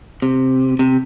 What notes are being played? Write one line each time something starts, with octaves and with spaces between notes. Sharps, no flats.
C3
C3